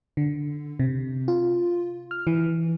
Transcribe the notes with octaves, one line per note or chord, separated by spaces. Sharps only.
D3
C3
F4
F6
E3